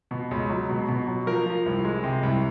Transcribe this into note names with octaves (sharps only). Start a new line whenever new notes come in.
B2
C#2
F#3
B2
B2
F#3
F3 A#4
F3
C2
G#3
C3
C2